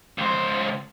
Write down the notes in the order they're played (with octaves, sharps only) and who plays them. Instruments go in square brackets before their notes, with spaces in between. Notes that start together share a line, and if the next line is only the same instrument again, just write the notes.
[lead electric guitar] C#2 C5